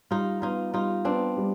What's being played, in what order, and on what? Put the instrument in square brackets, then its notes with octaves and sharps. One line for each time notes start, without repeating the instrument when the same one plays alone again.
[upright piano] G3 [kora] D#4 F4
[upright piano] B3 [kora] D#4 F4
[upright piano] G3 [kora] D#4 F4
[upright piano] B3 [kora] C4 D4
[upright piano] G3